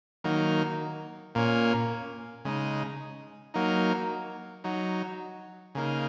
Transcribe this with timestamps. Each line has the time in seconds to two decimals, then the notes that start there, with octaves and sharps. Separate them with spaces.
0.24 D#3 F#3 A#3 D#4
1.35 A#2 A#3 C#4
2.45 C#3 G#3 D#4
3.54 F#3 A#3 D#4
4.64 F#3 D#4
5.75 C#3 A#3 D#4